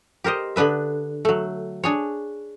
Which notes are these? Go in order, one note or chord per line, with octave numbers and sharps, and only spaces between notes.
G4 A#4 C5 D#5
D3 B3 D4 B4 E5
F#3 A3
D4 G#4 C#5